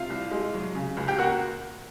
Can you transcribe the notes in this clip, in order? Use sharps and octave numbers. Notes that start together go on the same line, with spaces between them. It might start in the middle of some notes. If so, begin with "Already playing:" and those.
Already playing: C3 F4 F5
C2
G#3
F#3
C#3
C#2
G4 G5
A#3 F#4 F#5